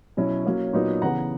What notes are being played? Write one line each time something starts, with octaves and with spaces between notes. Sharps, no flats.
B2 F#3 C#4 E4
F#3 A#3 C#4
A#2 F#3 B3 D#4
C#3 E3 B3 F#5 A#5